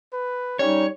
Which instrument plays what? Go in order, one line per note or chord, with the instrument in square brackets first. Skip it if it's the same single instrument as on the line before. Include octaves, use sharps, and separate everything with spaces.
[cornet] B4
[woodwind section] G3 D#4 [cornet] C#4 [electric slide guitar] C#5